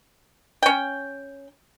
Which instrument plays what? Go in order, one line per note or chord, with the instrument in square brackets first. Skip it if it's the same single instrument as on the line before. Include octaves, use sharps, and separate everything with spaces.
[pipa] C#4 G5